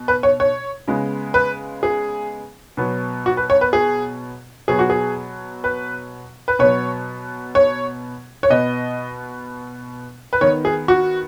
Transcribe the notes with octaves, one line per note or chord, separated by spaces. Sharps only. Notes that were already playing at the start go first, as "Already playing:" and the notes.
Already playing: B2
B4
C#5
C#5
C#3 G#3 B3
B4
G#4
B2 F#3 B3
F#4
B4
C#5
B4
G#4
B2 F#3 B3 G#4
F#4
G#4
B4
B4
B2 F#3 B3 C#5
C#5
C#5
B2 B3 D#5
B4
D#3 B3 C#5
G#4
F#4